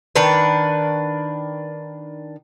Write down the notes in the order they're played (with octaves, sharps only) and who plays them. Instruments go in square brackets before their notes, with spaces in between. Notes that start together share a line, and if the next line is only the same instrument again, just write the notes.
[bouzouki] D#3 D4 B4